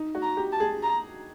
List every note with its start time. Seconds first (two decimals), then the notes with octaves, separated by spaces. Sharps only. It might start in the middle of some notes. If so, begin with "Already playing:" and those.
Already playing: D#4
0.15 F#4
0.22 A#5
0.37 G4
0.52 A5
0.60 G#4
0.83 A#5